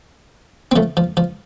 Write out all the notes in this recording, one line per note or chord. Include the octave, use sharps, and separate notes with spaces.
C4
F3 A3
F3
F3